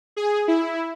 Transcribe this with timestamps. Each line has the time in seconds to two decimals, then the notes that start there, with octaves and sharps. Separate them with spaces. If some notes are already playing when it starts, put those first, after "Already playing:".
0.16 G#4
0.48 E4